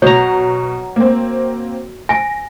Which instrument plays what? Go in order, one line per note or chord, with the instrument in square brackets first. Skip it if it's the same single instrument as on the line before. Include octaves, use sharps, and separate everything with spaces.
[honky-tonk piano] B2 [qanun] F#3 A#5 [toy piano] C#5
[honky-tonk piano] A#3 C4
[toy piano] G#5 [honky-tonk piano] A#6